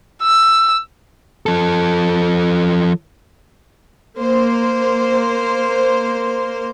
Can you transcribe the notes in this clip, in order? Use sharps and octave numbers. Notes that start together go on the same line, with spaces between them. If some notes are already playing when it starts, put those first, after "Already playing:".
E6
F3 A4
A#3 C5